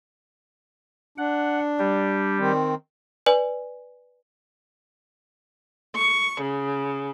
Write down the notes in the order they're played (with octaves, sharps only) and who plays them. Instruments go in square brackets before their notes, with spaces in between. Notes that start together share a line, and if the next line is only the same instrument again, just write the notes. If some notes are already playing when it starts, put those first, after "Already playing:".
[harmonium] D4 [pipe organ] F#5
[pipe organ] G3 G4
[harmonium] D#3 C4
[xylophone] B4 D5 G#5
[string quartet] C#6
C#3